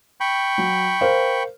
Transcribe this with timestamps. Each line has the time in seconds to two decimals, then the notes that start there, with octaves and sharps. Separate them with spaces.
0.20 G5 B5 C#6
0.58 F#3
1.01 A#4 C5 F5